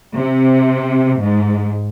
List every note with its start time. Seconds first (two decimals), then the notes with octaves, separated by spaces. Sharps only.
0.18 C3
1.24 G#2